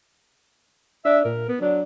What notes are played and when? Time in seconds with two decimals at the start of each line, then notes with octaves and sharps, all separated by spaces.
1.05 D4 E5
1.25 A#2 A#4
1.49 B3
1.61 F#3 D4